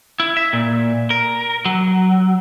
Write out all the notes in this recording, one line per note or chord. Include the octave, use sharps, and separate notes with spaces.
E4
E5
A#2
A#4
F#3